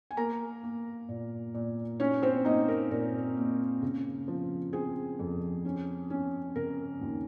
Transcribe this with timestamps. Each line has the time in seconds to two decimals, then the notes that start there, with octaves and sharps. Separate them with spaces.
0.11 G#5
0.17 A#3 A#4 A#5
0.63 A#3
1.09 A#2
1.54 A#2
2.00 C#4 D#4 C#5
2.22 C4 C5
2.45 A#3 D#4 D#5
2.68 A#4
2.91 A#2 A#4
3.37 A#3
3.82 C#3
4.28 F3
4.73 C4 G#4
5.19 F2
5.65 C#4
6.10 C#4
6.56 C#3 A#4
7.01 D#2